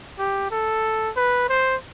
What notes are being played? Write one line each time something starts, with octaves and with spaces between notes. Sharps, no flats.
G4
A4
B4
C5